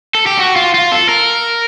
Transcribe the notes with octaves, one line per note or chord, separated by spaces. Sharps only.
A4
G4
F#4
F4
F4
A4
A#4